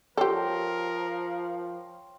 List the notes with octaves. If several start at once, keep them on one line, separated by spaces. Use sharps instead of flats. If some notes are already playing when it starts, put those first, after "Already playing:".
F3 G4 A4 A#4 C#5 G5 C6